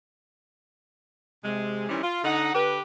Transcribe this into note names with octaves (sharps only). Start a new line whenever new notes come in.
C3 G#3
D#3 E3 G3 C4 C#4 E4
F4
D3 D#4 F#5
D3 G4 B4